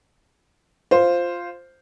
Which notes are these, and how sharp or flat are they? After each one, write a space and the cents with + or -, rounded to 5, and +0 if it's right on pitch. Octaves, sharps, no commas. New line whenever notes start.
F4 +0 C5 +0